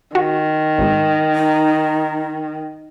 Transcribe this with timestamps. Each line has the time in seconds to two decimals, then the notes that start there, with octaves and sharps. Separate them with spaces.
0.15 D#3 F#4
0.78 G#1 G#2
1.35 D#4